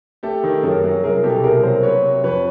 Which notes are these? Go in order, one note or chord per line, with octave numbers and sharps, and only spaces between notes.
A3 G4 A4
D#3
F#2 G#4 A#4
F#3
C2 G#4 A#4
B2 G4 A4
C2 G#4 A#4
F#3 A#4 C5
F#3 B4 C#5
C3
F2 B4 C#5